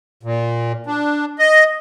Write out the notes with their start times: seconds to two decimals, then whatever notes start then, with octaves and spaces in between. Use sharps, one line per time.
0.23 A#2
0.87 D4
1.39 D#5